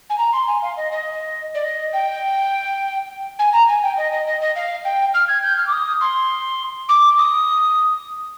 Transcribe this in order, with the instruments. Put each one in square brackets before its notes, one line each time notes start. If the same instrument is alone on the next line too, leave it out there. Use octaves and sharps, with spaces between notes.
[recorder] G#5
A#5
C6
G#5
F5
D#5
D#5
D5
D#5
G5
G#5
A#5
G#5
G5
D#5
D#5
D#5
D#5
F5
G5
F6
G#6
G6
F6
D6
D#6
C6
D6
D#6